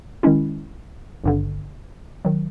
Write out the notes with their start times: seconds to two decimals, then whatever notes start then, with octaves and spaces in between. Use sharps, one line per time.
0.23 D#3 G#3 C#4 E4
1.24 G#1 G2 D3
2.25 D#3 F#3